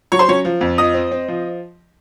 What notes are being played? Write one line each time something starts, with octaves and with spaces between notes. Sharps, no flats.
F#3 C#5 C#6
C5 C6
F#3 C#4 C#5
F3
F2
F3 D#5 D#6
C4
C4
F3